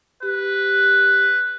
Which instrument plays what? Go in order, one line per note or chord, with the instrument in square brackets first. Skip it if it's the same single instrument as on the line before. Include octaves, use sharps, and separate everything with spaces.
[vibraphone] G4 [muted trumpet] B4